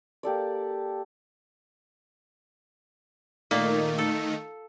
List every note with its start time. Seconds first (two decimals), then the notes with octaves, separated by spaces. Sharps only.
0.23 A#3 G4 A4 D5
3.51 A#2 D#3 A3 A#3 D#4
3.98 A4